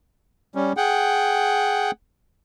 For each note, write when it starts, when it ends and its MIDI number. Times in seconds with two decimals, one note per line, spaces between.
0.55 0.73 55
0.55 0.73 61
0.77 1.91 68
0.77 1.91 78
0.77 1.91 79